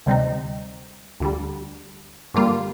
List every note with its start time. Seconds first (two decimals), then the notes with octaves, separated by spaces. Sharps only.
0.06 D2 C3 G3 C4 D#4
1.20 D2 D3 G3
2.34 G2 D3 G3 A#3 F4